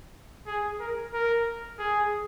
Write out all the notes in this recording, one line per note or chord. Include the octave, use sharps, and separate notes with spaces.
G#4
A#4
A#4
G#4